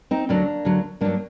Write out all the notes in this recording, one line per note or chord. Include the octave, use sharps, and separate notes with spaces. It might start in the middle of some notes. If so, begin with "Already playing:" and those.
C4 D#4
D2 D3 F#3 A#3 D4
D2 D3 F#3
G2 F#3 A#3 D4